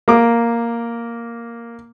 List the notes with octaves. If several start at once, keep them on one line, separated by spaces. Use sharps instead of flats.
A#3 D6